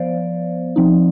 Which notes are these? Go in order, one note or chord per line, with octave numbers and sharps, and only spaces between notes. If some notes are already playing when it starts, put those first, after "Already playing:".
Already playing: F3 B3 C5 D5 F5
F3 C4 D#4